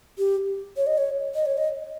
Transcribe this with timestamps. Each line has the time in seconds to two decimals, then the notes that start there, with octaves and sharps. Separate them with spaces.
0.18 G4
0.77 C#5
0.87 D#5
0.98 C#5
1.35 D#5
1.46 C#5
1.57 D#5